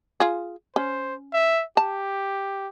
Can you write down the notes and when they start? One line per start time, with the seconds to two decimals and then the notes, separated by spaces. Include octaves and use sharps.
0.20 F4 G#4
0.76 C#4 C5
1.33 E5
1.77 G4 A5